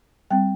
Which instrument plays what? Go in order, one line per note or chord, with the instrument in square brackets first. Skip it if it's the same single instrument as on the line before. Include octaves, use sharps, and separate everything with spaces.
[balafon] G3 C4 G5